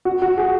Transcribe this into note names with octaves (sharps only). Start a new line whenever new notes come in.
F#4
F#4
G#4